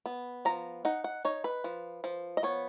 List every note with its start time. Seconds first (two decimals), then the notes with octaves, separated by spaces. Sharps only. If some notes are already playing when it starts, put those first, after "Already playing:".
0.06 B3
0.45 F3 A#5
0.85 D#4 F#5
1.04 F#5
1.25 D#4 C#5
1.44 B4
1.64 F3
2.04 F3
2.37 D#5
2.43 B3 C#5